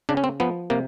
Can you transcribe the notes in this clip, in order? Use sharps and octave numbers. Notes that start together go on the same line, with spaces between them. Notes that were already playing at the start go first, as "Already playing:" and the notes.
C#3 D4
C#4
C4
F3 B3
C3 A#3